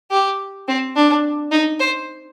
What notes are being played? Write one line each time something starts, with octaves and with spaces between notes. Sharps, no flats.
G4
C4
D4
D#4
C5